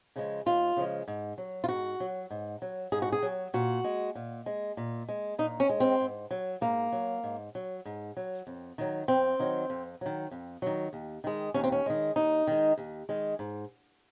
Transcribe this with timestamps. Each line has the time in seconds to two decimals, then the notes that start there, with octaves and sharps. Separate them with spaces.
0.16 C#3 F3 G#3
0.46 D#2 F4
0.76 C#3 F3 G#3
1.08 G#2
1.38 F#3
1.64 F4
1.68 G#2 F#4
2.00 F#3
2.30 G#2
2.62 F#3
2.92 G#2 G#4
3.02 F#4
3.12 G#4
3.23 F#3
3.54 A#2 F#4
3.84 G#3
4.15 A#2
4.46 G#3
4.77 A#2
5.09 G#3
5.38 A#2 D#4
5.60 C#4
5.69 G#3
5.80 C4
6.00 G#2
6.31 F#3
6.61 G#2 A#3
6.92 F#3
7.23 G#2
7.55 F#3
7.85 G#2
8.17 F#3
8.47 F2
8.78 D#3 F#3
9.08 F2 C4
9.40 D#3 F#3
9.70 F2
10.01 D#3 F#3
10.31 F2
10.62 D#3 F#3
10.93 D#2
11.24 D#3 G#3
11.54 D#2 C#4
11.64 C4
11.72 C#4
11.86 D#3 G#3
12.16 D#2 D#4
12.47 D#3 G#3
12.78 D#2
13.09 D#3 G#3
13.39 G#2